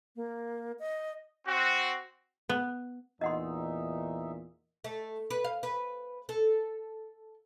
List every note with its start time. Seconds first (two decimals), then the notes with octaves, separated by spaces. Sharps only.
0.16 A#3
0.79 D#5
1.47 C4 F#4
2.49 B3
3.21 E2 A#2 D#4 D#5 E5 F#5 C6
4.84 A3
5.30 B4
5.44 F5
5.63 B4
6.29 A4